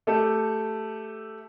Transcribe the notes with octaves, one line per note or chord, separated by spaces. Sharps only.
A3 G4 A4